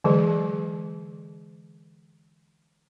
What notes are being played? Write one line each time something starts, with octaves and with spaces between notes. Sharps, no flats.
D3 E3 F#3 G#3 G#4